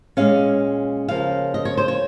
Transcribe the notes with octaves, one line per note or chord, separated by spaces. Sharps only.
A#2 G#3 C#4 F5
C#3 F3 A#3 C#4 F5
D#5
C#5
C5
C#5